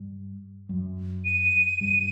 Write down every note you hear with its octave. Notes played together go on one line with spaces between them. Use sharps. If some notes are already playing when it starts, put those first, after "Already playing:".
Already playing: G2 G3
F#2 F#3
D#7
G2 G3